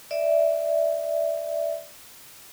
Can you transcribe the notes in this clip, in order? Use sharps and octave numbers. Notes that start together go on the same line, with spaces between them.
D5 E5